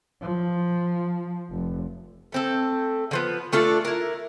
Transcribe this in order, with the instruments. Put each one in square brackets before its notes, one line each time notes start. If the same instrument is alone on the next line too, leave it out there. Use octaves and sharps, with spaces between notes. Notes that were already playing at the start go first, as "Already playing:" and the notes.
[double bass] F3
F1
[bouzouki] A3 C4 A4
D3 F3 B3
A3 D4 F4 A4
E4 A#4